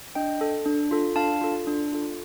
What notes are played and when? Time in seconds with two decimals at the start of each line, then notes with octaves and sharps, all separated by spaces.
0.15 D4 D#5 G5
0.41 A4
0.65 D4
0.91 F4 A4
1.16 D4 F5 A5
1.41 F4 A4
1.67 D4
1.92 F4 A4